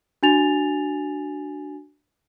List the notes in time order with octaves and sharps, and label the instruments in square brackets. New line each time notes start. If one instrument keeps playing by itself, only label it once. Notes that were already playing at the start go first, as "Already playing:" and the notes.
[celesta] D4 F#4 G#5 A6 F7